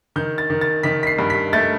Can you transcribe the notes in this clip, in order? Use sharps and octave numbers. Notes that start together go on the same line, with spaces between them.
D#3 G6
A6
D#3
A6
D#3 B6
B6
C7
G2
B6
A3 A6